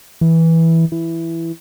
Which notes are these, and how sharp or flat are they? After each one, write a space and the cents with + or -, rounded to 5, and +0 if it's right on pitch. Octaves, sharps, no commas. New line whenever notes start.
E3 -10
E3 +5